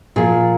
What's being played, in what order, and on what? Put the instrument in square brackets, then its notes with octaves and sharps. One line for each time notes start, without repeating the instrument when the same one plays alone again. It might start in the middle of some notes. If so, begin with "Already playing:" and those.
[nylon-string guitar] A#2 F3 G#4